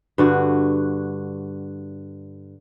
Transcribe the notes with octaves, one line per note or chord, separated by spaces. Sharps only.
G2 D3 F#4